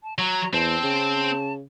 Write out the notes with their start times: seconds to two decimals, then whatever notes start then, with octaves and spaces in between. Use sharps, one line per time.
0.03 A5
0.18 F#3 A#5
0.54 E2 C4 A5
0.83 C#3